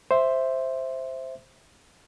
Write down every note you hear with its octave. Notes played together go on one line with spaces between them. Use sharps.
C5 E5